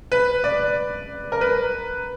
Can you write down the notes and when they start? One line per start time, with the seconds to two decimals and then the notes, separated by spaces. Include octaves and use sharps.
0.12 B4
0.44 D5
1.32 A#4
1.41 B4